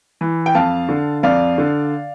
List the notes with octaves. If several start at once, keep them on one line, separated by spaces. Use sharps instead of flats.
E3
G5
F2 F5 A5
D3
F2 D5 F5
D3